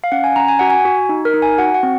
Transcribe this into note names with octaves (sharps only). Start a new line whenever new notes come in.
F5
C#4 F#5
G#5
C#4 A#5
G#5
F#4 F#5
G#5
F#4
D#4
A#4
D#4
G#5
F#4 F#5
F#5
C4